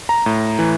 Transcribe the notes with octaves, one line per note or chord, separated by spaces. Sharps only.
A#5
A2
E3